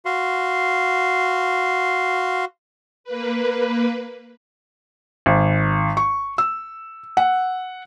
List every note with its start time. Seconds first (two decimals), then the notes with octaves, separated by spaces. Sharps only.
0.05 F#4 F5 C6
3.04 A#3 B4
5.26 G#1
5.97 C#6
6.38 E6
7.17 F#5